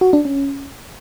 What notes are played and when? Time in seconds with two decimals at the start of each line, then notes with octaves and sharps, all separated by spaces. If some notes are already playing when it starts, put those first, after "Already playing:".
0.01 F#4
0.13 D4
0.25 C#4